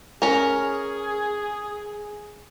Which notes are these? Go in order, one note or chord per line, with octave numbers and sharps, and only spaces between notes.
C#4 G#4 A#4